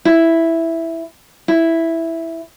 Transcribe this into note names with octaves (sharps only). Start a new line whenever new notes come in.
E4
E4